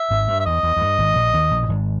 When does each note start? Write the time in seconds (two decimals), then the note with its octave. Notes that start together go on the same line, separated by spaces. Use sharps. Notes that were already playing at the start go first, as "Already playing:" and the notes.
Already playing: E5
0.10 G#1 G#2
0.28 G2
0.40 E5
0.46 E2 D#5
0.63 E2
0.77 E2
0.81 G2
0.99 G#1 G#2
1.16 A#1 A#2
1.34 D#2 D#3
1.51 A#1 A#2
1.63 A#2
1.68 G#1 G#2